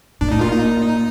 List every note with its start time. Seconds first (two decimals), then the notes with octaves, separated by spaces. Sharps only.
0.21 A#2 D4
0.30 A2 D#4
0.40 A#2 F4
0.52 D#4